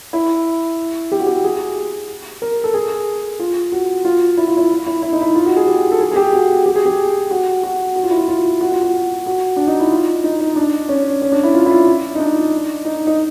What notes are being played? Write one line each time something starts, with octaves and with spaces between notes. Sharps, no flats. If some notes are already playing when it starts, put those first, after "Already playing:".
E4
G4
F#4
G4
G#4
A#4
A4
G#4
F4
F#4
F4
E4
F4
E4
E4
E4
D#4
E4
F4
F#4
G#4
G4
A4
G#4
G#4
G4
F#4
G4
G#4
G4
F#4
F#4
F#4
F4
E4
F4
F4
F#4
F4
F#4
F#4
D4
D#4
E4
F4
D#4
D#4
D4
C#4
C#4
D4
E4
F4
E4
F4
D#4
D4
D#4
D#4